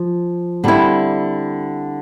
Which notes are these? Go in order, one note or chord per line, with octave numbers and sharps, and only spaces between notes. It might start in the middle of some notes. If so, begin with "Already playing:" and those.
Already playing: F3
D3 G3 C4 E4